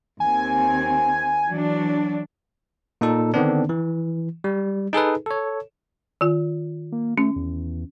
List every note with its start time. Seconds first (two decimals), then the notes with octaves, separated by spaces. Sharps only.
0.20 D#2 C4 G#5
1.47 E3 F#3 D4
3.01 A#2 D#4 A4
3.34 D3 D#3 B3 C4 D4
3.69 E3
4.44 G3
4.93 D#4 G#4 A4 B4
5.26 A4 C#5
6.21 D#3 F4
6.92 A#3
7.18 A3 C#4
7.36 E2